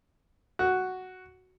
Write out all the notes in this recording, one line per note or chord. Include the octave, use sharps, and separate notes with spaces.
F#4